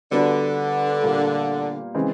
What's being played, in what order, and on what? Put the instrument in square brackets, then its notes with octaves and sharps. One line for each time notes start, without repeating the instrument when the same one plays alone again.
[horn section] D3 [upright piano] G3 B3 D4 F#4 B4
[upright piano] A#2 G3 A#3
C#3 E3 G#3 C4